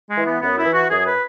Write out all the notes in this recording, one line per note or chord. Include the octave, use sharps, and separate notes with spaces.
G#3
E3
B3
F#2 B3
E4
E3
F#4
F#2 G#4
B4